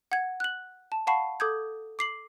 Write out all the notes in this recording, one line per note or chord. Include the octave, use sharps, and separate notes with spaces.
F#5 G#6
F#6 F#7
A5
F5 F#5 A5 B5 C#6 C7
A4 D6 D#6 G6 G#6
D6 C7 F#7